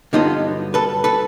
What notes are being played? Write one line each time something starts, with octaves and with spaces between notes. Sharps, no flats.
G2 D3 F#3 B3 D#4 F4
A4 B4
A4 B4